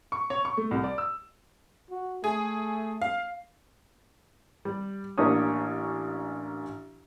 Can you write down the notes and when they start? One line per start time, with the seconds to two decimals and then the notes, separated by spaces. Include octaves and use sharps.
0.12 C#6
0.30 C#5
0.45 C#6
0.57 A3
0.71 C2
0.84 D5
0.98 E6
1.91 F#4
2.24 A3 G#4
3.02 F5
4.65 G3
5.18 A1 A#3 D4 G4 C#5 D#6